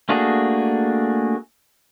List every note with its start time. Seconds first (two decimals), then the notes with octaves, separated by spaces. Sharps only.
0.09 A3 A#3 D4 F#4 G#4